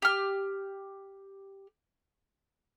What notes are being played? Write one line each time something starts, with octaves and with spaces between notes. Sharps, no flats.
G4 F6